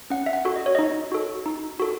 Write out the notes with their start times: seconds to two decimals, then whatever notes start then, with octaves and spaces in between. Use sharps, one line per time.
0.10 C#4 F#5
0.26 E5
0.33 F#5
0.45 F#4 A4
0.56 D#5
0.66 C#5
0.75 D#4 D#5
1.12 F#4 A4
1.46 D#4
1.80 F#4 A4